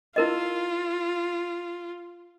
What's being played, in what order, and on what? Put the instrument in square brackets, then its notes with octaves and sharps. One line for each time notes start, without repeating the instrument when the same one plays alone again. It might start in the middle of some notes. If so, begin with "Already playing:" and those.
[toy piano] E4 A#4 D#5 [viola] F4